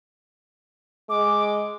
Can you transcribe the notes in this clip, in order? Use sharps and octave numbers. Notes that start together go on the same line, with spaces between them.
G#3 D6